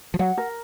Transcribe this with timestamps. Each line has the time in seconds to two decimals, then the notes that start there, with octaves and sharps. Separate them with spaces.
0.14 F3
0.19 F#3 F#5
0.37 A#4